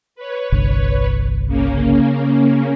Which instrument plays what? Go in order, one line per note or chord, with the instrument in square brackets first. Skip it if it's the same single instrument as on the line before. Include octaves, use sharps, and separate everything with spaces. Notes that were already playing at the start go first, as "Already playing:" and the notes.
[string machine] B4 C#5
[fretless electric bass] G1 C2 D3
[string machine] C#3 A#3 C#4